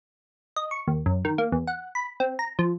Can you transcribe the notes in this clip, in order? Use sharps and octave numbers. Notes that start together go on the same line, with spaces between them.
D#5
C#6
D#2
F#2
D#3
A#3
E2
F#5
B5
C4
A#5
F3